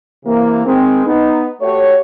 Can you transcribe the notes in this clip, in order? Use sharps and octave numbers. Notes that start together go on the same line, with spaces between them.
C3 E3 A#3
D#3 G#3 C4
B3 D#4
A3 F#4 G4 C#5